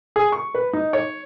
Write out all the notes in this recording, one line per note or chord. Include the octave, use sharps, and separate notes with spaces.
G#4
C#6
B4
D#4
C#5